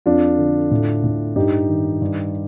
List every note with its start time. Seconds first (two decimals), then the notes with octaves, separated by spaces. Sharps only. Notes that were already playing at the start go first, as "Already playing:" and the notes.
0.06 F2 D4 F4
0.38 D3
0.71 A2
1.04 A2
1.36 G2 D#4 G4
1.68 D#3
2.01 G2